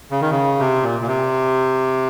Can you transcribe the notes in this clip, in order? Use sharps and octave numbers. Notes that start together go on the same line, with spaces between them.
C#3
D#3
C#3
C3
A#2
A#2
C3